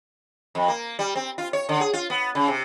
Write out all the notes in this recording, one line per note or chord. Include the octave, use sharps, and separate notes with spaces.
F2
A#3
G3
C4
F4
C#5
D3
G#4
F4
B3
C#3
C3